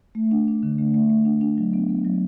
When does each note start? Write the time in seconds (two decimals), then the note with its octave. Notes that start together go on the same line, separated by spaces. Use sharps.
0.15 A3
0.31 D4
0.48 D4
0.63 D3
0.79 A3
0.95 A3
1.10 A3
1.25 D4
1.41 D4
1.58 F#3
1.74 B3
1.90 B3
2.05 F#3